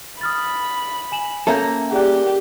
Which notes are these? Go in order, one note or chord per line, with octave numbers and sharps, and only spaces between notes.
B5 D#6 F6 A6
G#5 E7 F#7
A#3 C#4 A4 E5 A#5 G6
G4 G#4 D5 F#6